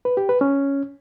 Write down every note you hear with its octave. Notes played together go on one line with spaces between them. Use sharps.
B4
G4
B4
C#4